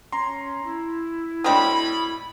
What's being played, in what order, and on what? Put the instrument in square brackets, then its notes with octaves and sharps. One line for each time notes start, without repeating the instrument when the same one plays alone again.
[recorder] C#4 [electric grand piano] A#5 C6
[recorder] E4
[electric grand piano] A2 D#5 D#6 [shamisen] F#3 C4 D4 [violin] B5